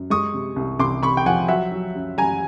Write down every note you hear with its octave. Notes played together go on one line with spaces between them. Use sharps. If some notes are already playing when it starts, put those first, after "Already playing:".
Already playing: F#2
G#3 C#6 D#6
C3
C2
C2 C6 D6
C3 B5 C#6
G5
F3 F#5 G#5
F#3 E5 F#5
F#3
F#2
F#2 G#5 A#5